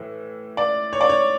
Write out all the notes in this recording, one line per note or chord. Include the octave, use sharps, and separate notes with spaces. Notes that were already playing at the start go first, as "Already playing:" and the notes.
Already playing: A2 E3
D5
C#5
D5
C#5